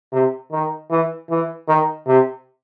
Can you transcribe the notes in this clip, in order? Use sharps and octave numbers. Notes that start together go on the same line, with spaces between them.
C3
D#3
E3
E3
D#3
C3